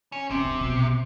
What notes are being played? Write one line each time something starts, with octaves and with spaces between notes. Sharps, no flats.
C#4
C3 C#4
D4
A#1 B2